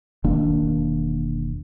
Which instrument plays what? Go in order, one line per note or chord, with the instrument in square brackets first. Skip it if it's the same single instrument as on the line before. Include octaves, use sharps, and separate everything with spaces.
[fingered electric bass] E1 D#3 A#3 D4